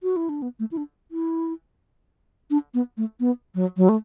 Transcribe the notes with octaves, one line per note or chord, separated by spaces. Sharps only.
F#4
E4
D4
B3
A3
E4
D4
E4
D4
B3
A3
B3
F#3
F#3
A3